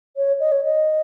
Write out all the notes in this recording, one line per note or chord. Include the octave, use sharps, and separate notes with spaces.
C#5
D#5
C#5
D#5